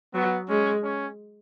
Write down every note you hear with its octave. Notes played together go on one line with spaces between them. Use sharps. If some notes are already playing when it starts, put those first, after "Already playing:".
F#3 B3
G#3 C#4
C#4